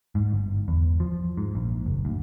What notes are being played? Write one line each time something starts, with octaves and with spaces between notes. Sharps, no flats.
G#2
G1
E2
F3
G#2
A#1
F#1
D2